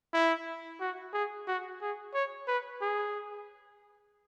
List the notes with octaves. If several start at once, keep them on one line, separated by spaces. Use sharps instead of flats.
E4
F#4
G#4
F#4
G#4
C#5
B4
G#4